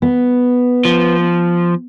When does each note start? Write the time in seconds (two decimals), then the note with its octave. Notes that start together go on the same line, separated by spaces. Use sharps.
0.02 B3
0.85 F3